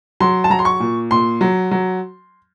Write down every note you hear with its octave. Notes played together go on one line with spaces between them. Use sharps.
F#3 C6
A5
F#3 A#5
C6
C#6
A#2
A#2 C6
F#3
F#3